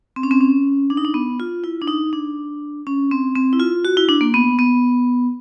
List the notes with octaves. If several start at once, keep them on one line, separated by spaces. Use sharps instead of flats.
C4
C#4
C4
C#4
D4
D#4
D4
B3
F4
E4
D4
D#4
D4
C#4
C4
C4
E4
F4
F#4
E4
D4
A#3
B3
B3